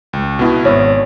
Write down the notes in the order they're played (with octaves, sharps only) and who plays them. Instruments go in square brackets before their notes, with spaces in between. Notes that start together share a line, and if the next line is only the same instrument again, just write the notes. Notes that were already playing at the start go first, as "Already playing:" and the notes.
[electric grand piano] C#2
B2 B3 E4
[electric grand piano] G#1 [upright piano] C#5